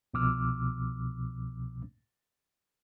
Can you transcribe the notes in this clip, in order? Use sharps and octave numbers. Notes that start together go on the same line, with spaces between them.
C2 B2 F3 D6 E6 F6